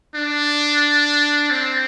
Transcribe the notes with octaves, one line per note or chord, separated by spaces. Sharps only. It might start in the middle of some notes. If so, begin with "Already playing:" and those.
D4
C4